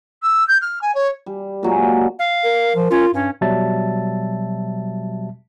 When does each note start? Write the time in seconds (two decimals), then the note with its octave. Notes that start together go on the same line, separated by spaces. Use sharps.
0.22 E6
0.47 G6
0.61 F6
0.81 G#5
0.94 C#5
1.26 G3
1.63 A#2 F#3 G#3
2.19 F5
2.44 A#4
2.76 F3
2.91 C#4 F4
3.14 G2 C#4
3.41 B2 F#3 G3 E5 A5 A6